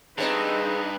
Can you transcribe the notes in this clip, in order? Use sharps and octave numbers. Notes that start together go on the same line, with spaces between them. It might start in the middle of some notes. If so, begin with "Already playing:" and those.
G2 G#3 C4 D#4 B4